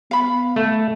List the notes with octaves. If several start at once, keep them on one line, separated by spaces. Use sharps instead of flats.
B3 F5 B5
A3